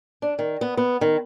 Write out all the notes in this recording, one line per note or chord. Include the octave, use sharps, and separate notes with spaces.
D4
D#3
B3
B3
D#3